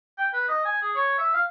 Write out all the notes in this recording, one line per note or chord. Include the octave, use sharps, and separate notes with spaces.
G5
B4
D#5
G#5
G#4
C#5
E5
F5